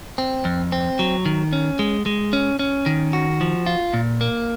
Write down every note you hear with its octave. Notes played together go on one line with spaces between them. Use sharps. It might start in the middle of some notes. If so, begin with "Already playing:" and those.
C4
F2
C4
F#3
D#3
C#4
G#3
G#3
C#4
C#4
D#3
F#4
F3
F4
A#2
A#3